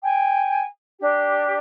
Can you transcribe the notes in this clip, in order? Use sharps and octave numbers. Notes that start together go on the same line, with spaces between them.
G5 G#5
D4 G4